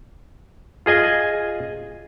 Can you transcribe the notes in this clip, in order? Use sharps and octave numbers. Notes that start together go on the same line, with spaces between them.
F4 G#4 D#5 G#5